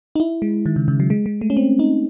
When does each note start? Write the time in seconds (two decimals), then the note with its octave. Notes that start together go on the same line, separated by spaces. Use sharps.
0.16 D#4
0.20 E4
0.42 G#3
0.66 D#3
0.76 C#3
0.88 C#3
1.00 F#3
1.10 G#3
1.26 G#3
1.41 A3
1.50 C#4
1.57 C4
1.79 D#4